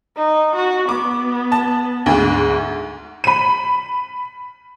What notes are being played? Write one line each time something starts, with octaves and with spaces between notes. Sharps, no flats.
D#4
F#4
B3 D6
A5
D2 G#2
B5 D#7